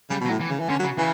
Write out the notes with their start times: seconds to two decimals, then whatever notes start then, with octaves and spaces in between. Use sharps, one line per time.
0.10 C#3 G3
0.21 B2
0.26 F#3
0.30 A2
0.40 E3
0.50 C#3
0.60 E3
0.69 D3 C#4
0.79 F#3
0.84 C#3
0.98 C#3 E3